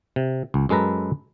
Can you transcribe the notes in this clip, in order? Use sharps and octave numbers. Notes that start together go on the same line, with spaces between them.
C3
C#2
F#2 G#3 A4 B4 A#5